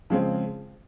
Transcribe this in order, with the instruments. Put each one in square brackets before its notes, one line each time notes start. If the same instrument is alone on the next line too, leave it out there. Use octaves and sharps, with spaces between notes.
[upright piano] C#3 F3 G#3 C4